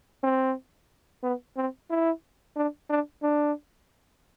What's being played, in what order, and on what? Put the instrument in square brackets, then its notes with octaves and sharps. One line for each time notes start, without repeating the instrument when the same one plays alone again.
[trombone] C4
B3
C4
E4
D4
D4
D4